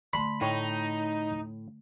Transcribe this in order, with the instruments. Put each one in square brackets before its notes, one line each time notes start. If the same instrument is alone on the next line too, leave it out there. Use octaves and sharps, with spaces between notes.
[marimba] D3 A3 C6 [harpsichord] B5
[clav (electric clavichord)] A2 C#5 [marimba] A3 G5 [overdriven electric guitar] D#4